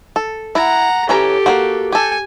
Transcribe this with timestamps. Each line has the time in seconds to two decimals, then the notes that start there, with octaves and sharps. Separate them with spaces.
0.16 A4
0.55 E4 F#5 A#5
1.09 E3 C#4 G4 A4 A#5
1.46 A#3 C4 F#4
1.92 G4 A4 G#5